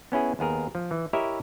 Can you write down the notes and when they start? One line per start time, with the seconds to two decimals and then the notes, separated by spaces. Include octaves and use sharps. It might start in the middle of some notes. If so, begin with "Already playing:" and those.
0.12 B3 C#4 E4 G#4
0.39 D#2 B3 G#4 A#4
0.75 F3
0.91 E3
1.13 E4 G4 A#4 C#5 D#5 E5